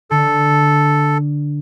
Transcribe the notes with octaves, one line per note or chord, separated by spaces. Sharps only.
D3 A4